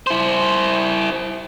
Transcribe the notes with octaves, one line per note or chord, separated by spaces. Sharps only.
E4 C5